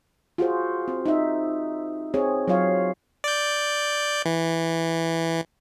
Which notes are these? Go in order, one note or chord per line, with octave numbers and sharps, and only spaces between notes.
F4 F#4 G#4 C5
C4
D#4 E5
C4 G#4 C#5
F#3 F4 C#5 F5
D5 G6
E3